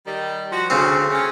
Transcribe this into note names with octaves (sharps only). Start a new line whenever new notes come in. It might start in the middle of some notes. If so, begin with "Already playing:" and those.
D#3 G3
F3 F#4
D2 C#3 C4
A3 C#4